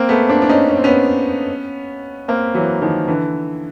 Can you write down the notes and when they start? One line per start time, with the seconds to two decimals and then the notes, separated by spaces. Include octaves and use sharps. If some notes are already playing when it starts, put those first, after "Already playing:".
Already playing: A#3 C4
0.09 A3 B3
0.29 C4 D4
0.42 D4
0.49 C#4 D#4
0.69 C#4
0.77 C4
0.84 B3 C#4
2.28 A#3 C4
2.54 E3 F#3
2.82 D#3 F3
3.08 D3 E3